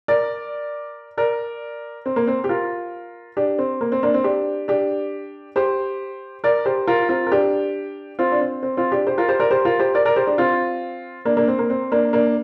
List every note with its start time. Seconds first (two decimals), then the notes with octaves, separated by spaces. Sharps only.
0.08 A#4 D5
1.17 A#4 D5
2.06 C4
2.16 A#3
2.27 C4
2.44 G4
2.49 F4 A#4
3.37 D4 G4
3.58 C4
3.81 A#3
3.92 C4
4.03 A#3 D4
4.14 C4
4.24 D4 G4
4.68 D4 G4
5.56 G4 C5
6.44 A#4 D5
6.65 G4 C5
6.87 F4 A#4
7.09 C4 F4
7.27 A#4
7.32 D4 G4
8.19 C4 F4
8.32 D4
8.41 C4
8.63 C4
8.77 C4 F4
8.92 D4 G4
9.07 G4 C5
9.18 F4 A#4
9.28 G4 C5
9.40 A#4 D5
9.51 G4 C5
9.65 F4 A#4
9.79 G4 C5
9.95 A#4 D5
10.05 A#4 D5
10.16 G4 C5
10.27 D4 G4
10.38 C4 F4
11.25 A#3 D4
11.37 A#3 D4
11.48 C4
11.59 A#3
11.70 C4
11.92 A#3 D4
12.13 A#3 D4